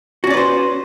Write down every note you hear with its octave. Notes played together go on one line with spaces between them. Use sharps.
C#4 F#4 B4 C5 D5